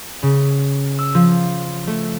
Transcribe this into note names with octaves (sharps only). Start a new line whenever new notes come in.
C#3
E6
F3
A3